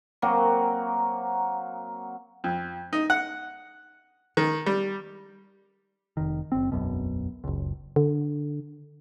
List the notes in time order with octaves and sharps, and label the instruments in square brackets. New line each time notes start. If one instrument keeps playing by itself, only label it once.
[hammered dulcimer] F#3 A#3 C4 F#4
[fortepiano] F2
D#4
F#5
D#3
G3
[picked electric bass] F1 D#3
F#1 C4
E1 B1 F#2 B2
F#1 C#2
[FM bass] D3